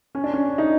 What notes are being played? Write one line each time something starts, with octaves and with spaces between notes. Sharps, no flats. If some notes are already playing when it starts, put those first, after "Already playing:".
C#4
D4
C#4
D#4